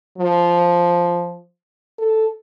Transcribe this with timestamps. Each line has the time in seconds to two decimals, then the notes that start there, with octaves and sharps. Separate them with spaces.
0.18 F3
1.99 A4